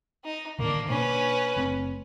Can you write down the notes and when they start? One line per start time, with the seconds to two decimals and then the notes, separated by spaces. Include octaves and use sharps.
0.25 D#4
0.59 A2 D3 D#3 A#3 D4
0.88 B2 A#3 C#4 D4 B4
1.57 F#1 A3 C4